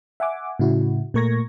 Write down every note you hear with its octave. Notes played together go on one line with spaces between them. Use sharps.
E5 F#5 G#5 D6
A2 C#3 E4 F#4
A#2 A3 A#4 C#6 G#6 A#6